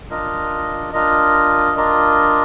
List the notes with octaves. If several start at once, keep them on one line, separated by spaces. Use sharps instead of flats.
D4 F4 A#4 D#5
D4 F4 A#4 D#5
D4 F4 A#4 D#5